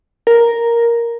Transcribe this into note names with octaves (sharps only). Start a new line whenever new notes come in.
A#4